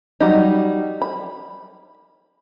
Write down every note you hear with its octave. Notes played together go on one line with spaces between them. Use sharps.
F#3 G3 D#4
B5